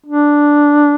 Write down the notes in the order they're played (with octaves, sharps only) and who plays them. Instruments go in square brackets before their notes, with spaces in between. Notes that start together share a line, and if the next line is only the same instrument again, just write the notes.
[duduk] D4